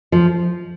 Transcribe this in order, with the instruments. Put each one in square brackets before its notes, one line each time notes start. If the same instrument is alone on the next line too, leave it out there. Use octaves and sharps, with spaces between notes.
[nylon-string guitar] F3